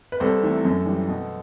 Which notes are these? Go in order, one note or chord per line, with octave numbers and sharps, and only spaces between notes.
B4
C2 A4 C5
C3 E3 A3
F#2
E3 G3
B2